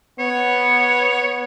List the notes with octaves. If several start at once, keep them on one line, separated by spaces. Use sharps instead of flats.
B3 C#5